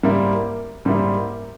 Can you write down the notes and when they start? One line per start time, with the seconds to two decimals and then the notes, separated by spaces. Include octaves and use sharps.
0.03 G#2 G3 A#3 E4
0.85 G#2 G3 A#3 E4